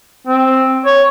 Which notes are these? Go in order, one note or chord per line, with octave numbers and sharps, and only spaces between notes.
C4
C#5